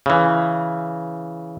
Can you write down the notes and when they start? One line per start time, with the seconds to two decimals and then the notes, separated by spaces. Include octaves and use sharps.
0.06 C#3 E3